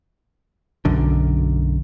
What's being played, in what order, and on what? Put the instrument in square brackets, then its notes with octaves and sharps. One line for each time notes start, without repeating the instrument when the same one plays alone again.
[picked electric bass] B1 F#2 D3